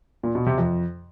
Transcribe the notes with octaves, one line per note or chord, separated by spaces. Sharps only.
A#2
B2
C3
F2